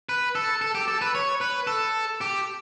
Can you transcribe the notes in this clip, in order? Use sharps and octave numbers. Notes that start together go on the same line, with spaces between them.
B4
A4
A4
G4
A4
B4
C#5
B4
A4
G4